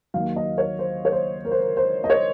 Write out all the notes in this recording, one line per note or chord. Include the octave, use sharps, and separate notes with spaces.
D#2 D#3 F#3 F5
D#5
C#5
C5
C#5
C5
A#4
C5
A#4
C5
D#5
C#5